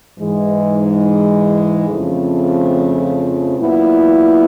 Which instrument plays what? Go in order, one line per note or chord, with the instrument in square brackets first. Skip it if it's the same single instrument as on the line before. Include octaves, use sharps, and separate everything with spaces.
[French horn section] G#2 E3 G#3
F2 C#3 F3 A3
A#2 F#3 B3 E4